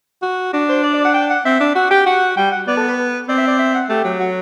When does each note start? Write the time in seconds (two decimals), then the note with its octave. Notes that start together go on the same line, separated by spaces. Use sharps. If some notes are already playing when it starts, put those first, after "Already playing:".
0.22 F#4
0.53 D4 F#4
0.69 C5
0.83 D5
0.94 D5
1.05 F#5
1.14 G5
1.30 F#5
1.45 C4 E5
1.60 D4
1.75 F#4 F#5
1.90 G4 G5
2.06 F#4 F#5
2.37 G3 G5
2.51 F#5
2.67 B3 D5
2.77 A4
2.88 B4
3.28 C4 D5
3.38 E5
3.47 D5
3.59 E5
3.74 F#5
3.89 A3 G4
4.04 F#3
4.20 F#4